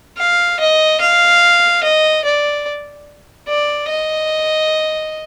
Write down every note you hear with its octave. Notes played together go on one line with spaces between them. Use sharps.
F5
D#5
F5
D#5
D5
D5
D#5